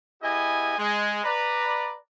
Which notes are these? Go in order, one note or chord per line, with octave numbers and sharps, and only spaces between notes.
B3 E4 G4 G#4 D#5 G#5
G#3
B4 D5 A#5